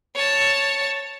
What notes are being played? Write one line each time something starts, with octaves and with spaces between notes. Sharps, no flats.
C#5 A5